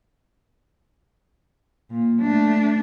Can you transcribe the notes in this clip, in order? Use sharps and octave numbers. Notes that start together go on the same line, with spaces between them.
A#2
A3 D4